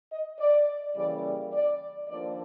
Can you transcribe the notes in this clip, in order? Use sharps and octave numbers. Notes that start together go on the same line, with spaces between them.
D#5
D5
C#3 E3 G3 A#3 D5
D5
D#2 D3 F3 A#3 D5